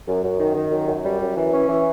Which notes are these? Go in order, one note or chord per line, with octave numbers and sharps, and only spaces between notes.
F#2
F#2
D#3
D#3
F#2
F#2
G3
F#2
E3
C#4
E3